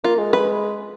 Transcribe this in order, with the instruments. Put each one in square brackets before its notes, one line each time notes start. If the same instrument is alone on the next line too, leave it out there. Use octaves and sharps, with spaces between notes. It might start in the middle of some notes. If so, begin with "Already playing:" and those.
[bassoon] A#3 [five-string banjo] F4
[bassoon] G#3
[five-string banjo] B4